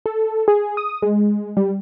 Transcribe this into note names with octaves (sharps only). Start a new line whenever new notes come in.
A4
G#4
D#6
G#3
G3